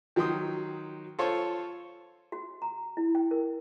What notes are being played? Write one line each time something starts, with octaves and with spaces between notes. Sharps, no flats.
D#3 F#3 G5 C6 D#6
F4 A4 C5 C#5
F#4
A#5
E4
G5
A#4